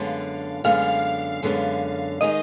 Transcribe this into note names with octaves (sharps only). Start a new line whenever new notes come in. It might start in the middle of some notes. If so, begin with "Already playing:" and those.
Already playing: F#2 D3 G#3 B3 F5
F#2 D3 G#3 B3 F5
F#2 D3 G#3 B3
D#3 G#3 D#4 D#5